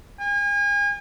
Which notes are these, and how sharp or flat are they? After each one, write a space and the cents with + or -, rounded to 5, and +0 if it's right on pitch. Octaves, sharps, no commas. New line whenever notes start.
G#5 -35